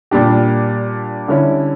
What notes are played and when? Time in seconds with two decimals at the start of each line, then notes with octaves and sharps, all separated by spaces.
0.11 A#2 G3 D4 G4
1.28 D3 G3 C#4 E4